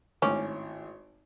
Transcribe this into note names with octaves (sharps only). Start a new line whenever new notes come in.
G#1 A2 C#4 D6